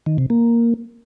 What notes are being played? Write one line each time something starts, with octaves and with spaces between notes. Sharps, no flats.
D#3
C3
A#3